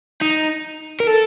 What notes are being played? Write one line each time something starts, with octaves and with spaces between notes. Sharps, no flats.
D#4
A#4
A4